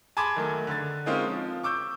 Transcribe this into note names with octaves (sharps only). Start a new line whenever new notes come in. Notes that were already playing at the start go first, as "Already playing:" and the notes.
G#5 A5 B5 C6 D6 G#6
D#3 F#3 A3
D3 A6
G#3 A#3 C4 C#4 D#4 F4
F3
C#6 D6 E6 G6